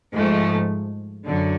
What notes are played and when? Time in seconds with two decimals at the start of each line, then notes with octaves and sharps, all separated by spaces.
0.12 G#2 F3 A3
1.27 F#2 D3 F#3